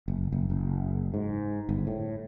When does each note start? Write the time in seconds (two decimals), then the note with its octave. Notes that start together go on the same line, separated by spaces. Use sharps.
0.08 F#1
0.32 F#1
0.50 F#1
1.14 G#2
1.69 G1
1.87 A2